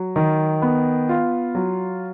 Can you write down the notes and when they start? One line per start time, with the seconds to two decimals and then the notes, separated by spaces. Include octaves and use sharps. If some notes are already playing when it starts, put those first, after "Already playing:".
Already playing: F#3
0.16 D#3
0.62 B3
1.09 F4
1.55 F#3